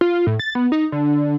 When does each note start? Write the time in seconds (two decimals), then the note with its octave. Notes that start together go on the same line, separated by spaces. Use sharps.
0.01 F4
0.27 A2
0.39 A6
0.55 B3
0.72 D#4
0.92 D3